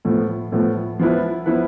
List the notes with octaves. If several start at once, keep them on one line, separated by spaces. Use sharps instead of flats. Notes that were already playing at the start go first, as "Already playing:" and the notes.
A2 F3 B3
A2 F3 B3
F3 B3 E4 B4
F3 B3 E4 B4